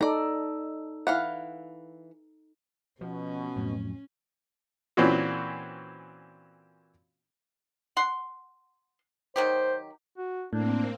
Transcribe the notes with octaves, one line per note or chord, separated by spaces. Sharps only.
D#4 A4 D5 A#5
E3 F5 F#5
B2 F3 C#4
F2 A2 F#3
A#2 E3 C4 C#4 F#4
F#5 C6
D#3 F#3 G4 C5
F#4
A2 A#3 C4 D4